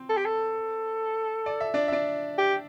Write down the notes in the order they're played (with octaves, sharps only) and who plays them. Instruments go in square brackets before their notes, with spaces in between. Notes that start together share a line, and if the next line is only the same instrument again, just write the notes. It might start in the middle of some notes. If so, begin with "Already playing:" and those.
Already playing: [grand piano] C4 C5
[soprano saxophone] A4
G4
A4
[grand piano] D5
E5
D4 D5
E5
D4 D5
[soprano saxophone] G4